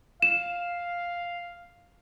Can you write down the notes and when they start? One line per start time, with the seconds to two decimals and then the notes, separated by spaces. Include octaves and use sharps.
0.22 F5 E7